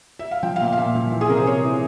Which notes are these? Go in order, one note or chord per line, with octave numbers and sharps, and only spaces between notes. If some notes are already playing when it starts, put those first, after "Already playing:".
E5
F5
F3 G5
F5
A#2 E5
F5
A#2 E5
F3
E3
G#4
C3 A#4
C5
C3 C#5
E3